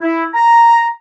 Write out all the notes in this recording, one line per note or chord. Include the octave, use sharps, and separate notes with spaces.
E4
A#5